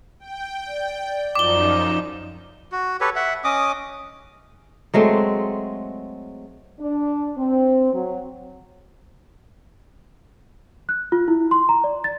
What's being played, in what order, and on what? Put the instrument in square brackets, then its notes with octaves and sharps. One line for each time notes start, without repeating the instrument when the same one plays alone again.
[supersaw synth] G5
[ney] D5
[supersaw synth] F#2 F3 D#4 [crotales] D6 G7
[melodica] F#4
G4 A4 B4 C#5
E5 F#5
C#4 D#5 D6 D#6
[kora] F#3 G#3 A3 C4
[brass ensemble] D4
C4
F#3
[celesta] F#6
F4
E4
C6
A#5
D5
A6